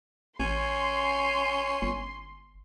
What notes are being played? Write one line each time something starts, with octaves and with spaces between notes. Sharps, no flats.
A1 C#4 C6
G1